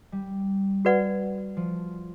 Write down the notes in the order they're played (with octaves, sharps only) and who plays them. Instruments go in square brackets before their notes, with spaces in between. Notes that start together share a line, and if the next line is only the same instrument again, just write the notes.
[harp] G3
[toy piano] F#4 B4 D5 F#5
[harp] F3